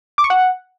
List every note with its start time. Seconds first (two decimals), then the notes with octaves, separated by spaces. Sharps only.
0.18 D6
0.24 C#6
0.30 F#5